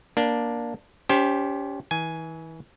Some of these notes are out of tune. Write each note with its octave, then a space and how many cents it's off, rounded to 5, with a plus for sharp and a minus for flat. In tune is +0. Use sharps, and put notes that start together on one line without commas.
A#3 +15 D4 +0
C#4 +35 G4 +0 C5 +10
E3 -35 G#5 +5